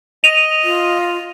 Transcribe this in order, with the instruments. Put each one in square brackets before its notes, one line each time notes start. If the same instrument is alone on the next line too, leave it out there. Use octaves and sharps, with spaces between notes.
[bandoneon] D#5 [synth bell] D#7 F7
[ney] F4